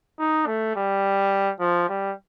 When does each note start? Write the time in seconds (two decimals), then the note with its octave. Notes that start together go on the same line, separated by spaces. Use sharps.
0.19 D#4
0.46 A3
0.76 G3
1.60 F3
1.89 G3